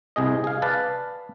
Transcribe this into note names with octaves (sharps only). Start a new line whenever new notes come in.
C2 C3 G#4 D#5
G#4 F5
B4 D5 F5 A5